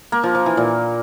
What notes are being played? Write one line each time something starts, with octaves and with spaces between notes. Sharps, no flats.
A#3
F3
F3
E3
A#2